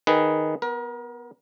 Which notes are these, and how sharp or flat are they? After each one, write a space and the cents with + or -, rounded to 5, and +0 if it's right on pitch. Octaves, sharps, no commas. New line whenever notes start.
D#3 +0 G#4 +0 B4 +0
B3 +0 A#4 +35